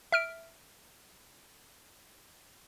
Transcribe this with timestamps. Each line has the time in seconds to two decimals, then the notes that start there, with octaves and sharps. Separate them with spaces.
0.12 E5 F6 D7